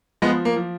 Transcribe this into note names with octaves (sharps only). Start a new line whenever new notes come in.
F3 G#3 B3
A#3
F3